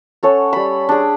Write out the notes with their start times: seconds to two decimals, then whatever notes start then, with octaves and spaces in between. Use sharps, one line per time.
0.23 C#4 A4 C#5 F#5
0.53 G3 B5
0.89 D4 G#4